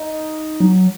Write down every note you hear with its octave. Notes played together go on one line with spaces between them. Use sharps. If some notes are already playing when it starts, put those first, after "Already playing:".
Already playing: D#4
F#3